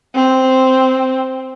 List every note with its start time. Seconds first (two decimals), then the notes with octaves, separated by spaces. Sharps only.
0.14 C4